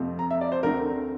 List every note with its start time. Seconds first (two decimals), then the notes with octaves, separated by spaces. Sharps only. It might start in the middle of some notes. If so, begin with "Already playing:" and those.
Already playing: F2 C3 F3 A3 C4
0.19 A#5
0.31 E5
0.41 D5
0.52 C5
0.63 D2 D3 A3 C4 A#4